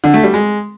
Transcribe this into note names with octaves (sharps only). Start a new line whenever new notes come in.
D3
A3
G3
G#3